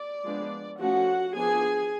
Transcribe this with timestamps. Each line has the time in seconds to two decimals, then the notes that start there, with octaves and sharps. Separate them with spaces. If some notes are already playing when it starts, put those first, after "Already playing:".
Already playing: D5
0.25 F3 G#3 B3 D4
0.80 F3 A3 C#4 F#4 F#5
1.36 F3 B3 D4 G#4 G#5